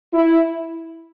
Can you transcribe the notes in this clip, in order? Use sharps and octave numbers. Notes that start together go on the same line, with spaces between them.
E4